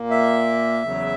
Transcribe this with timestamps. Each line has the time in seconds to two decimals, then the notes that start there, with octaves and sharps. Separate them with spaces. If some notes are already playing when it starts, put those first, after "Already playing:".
Already playing: A#2 A#3
0.10 E5
0.83 E2 C#3 F#3